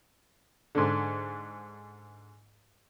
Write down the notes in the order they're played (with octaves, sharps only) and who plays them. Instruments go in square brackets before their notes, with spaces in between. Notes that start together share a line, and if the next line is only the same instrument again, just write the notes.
[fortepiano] G#2 D3